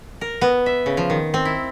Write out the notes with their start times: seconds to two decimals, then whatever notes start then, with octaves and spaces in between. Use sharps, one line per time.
0.21 A#4
0.41 B3
0.66 E5
0.86 C#3
0.97 F3
1.10 D#3
1.34 C4
1.45 E4